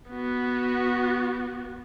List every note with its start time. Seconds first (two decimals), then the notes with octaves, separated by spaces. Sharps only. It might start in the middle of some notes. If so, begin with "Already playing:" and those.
0.10 B3 F#4